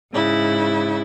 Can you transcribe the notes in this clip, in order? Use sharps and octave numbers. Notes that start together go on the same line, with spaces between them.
G#2 C#3 E4